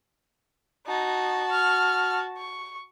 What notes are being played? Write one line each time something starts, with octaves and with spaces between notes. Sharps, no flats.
D#4 F#4 A5
F6
C#6